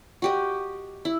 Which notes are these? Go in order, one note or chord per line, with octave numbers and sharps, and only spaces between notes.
F#4 G4 D#5
E4